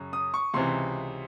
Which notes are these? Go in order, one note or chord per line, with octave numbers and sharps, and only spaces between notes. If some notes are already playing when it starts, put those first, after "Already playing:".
Already playing: F#2 C#3
D#6
C#6
C#2 C3 E3 C6